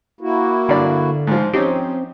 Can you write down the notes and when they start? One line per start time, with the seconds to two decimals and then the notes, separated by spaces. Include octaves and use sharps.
0.21 A#3 E4 F#4
0.69 G2 D3 D5
1.27 G#2 F3
1.53 F3 C4 C#4 D#4 G4